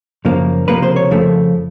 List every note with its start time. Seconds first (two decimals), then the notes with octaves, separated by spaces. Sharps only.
0.25 F#2 C#3 F3 A#3
0.67 C#2 C3 F3 A#3 B4
0.82 C5
0.96 C#5
1.11 F2 C#3 F3 A3